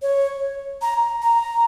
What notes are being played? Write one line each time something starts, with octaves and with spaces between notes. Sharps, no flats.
C#5
A#5
A#5